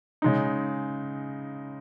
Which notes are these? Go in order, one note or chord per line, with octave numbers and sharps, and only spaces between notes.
C#3 G#3 D#4